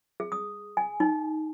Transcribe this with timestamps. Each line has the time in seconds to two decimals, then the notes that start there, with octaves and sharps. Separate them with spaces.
0.20 G#4
0.32 D#6
0.77 G#5
1.00 D#4